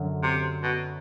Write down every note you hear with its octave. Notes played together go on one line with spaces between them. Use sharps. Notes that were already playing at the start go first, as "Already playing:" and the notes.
Already playing: F#2 D3 F#3
C3
B2